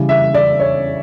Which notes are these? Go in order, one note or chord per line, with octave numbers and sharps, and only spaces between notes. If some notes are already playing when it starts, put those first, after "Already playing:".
Already playing: C#3 E3 G3
E5
D5
C#5